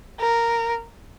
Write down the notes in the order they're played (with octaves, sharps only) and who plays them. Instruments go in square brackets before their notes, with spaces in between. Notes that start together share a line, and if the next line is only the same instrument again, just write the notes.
[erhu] A#4